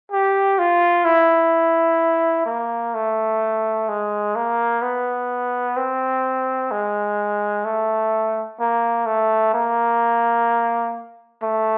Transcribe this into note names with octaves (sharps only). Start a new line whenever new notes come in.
G4
F4
E4
A#3
A3
G#3
A#3
B3
C4
G#3
A3
A#3
A3
A#3
A3